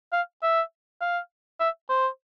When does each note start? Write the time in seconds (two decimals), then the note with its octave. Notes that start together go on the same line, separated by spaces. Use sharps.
0.12 F5
0.43 E5
1.01 F5
1.60 E5
1.89 C5